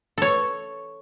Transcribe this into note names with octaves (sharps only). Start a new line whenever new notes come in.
A4 C#5